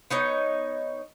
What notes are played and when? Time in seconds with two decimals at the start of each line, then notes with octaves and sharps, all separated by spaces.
0.10 B3 D#4 C#5